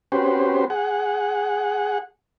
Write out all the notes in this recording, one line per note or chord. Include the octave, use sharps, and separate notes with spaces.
C4 C#4 F#4 G4 B4 C5
G#4 F#5